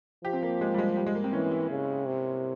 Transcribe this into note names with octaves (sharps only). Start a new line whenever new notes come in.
F3 G4
C4
A#3
G#3
G3
G#3
G3
G#3
A#3
C4
E3 C#4
E4
C#3
C3